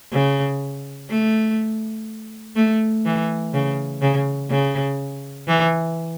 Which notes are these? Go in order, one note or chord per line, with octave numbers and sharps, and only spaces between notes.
C#3
A3
A3
E3
C#3
C#3
C#3
E3